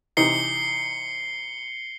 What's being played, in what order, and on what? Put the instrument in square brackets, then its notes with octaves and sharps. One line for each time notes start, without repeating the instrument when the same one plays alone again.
[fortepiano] C3 E3 D#4 [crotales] C7 C#7 G7